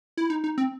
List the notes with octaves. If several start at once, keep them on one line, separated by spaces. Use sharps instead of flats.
E4
D#4
D#4
C4